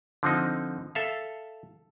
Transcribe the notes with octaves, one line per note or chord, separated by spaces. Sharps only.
D3 F3 C4 D#4
A4 E5 F5